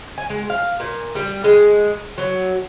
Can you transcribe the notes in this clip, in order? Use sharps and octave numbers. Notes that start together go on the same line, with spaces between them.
G#5
G#3
F5
A#2
G3
G#3
F#3